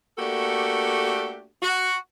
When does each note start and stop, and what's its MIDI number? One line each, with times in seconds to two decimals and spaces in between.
0.18 1.46 57
0.18 1.46 58
0.18 1.46 62
0.18 1.46 66
0.18 1.46 67
0.18 1.46 69
1.62 1.95 66